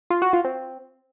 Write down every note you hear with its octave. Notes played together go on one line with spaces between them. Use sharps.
F4
F#4
F4
C4